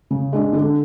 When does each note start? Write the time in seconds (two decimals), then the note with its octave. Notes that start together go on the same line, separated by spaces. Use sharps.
0.11 C#3
0.33 G#3 D4
0.53 D3